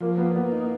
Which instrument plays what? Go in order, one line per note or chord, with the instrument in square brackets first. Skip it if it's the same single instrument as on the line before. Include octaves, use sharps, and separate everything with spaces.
[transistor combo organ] F3 [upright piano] A#3
[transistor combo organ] A#3 [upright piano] B3
[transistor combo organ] A#3 [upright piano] B3
[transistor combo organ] D#4